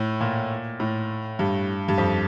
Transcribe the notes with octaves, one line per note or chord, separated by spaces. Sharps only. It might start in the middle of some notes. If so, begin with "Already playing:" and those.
Already playing: A2
A#2
A2
G2
G2
F2